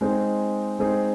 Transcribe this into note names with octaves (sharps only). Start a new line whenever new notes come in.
G#3 C4 D#4 G#4
G#3 C4 D#4 G#4